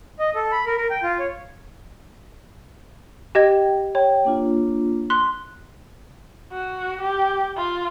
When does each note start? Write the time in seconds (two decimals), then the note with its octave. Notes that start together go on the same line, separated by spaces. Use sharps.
0.19 D#5
0.35 A4
0.52 B5
0.66 A#4
0.78 A#4
0.90 G5
1.03 F4
1.19 C#5
3.35 G4 D#5 G5 G#6
3.95 C#5 G5
4.25 A#3 D4 F4
5.10 C6 F#6
6.52 F#4
7.01 G4
7.57 F4